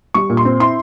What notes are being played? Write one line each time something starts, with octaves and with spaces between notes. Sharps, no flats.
G3 C#6
A#2
C6
C4
E4 C6